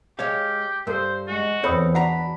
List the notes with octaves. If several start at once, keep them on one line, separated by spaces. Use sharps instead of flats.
G#3 G4 C#5 F5
G2 A4 A#4 C5
G#3 F#4
E2 C4 A4 C#5 B5 D#6
D4 F#4 F#5 A#5 B5